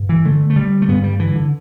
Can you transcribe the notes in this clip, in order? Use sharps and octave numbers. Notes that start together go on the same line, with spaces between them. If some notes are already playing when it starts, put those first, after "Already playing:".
Already playing: G2
E3
D3 A3
A3
D3 G3
A3
G2 B3
G3
D3 E3
D3